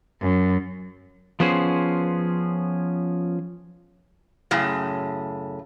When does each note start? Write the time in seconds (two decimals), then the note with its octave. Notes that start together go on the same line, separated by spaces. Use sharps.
0.21 F#2
1.40 F3 B3 C#4 G#4 C5
4.51 F#2 A2 C#3